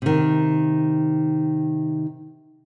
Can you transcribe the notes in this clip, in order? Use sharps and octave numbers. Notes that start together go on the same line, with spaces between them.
C3 D#3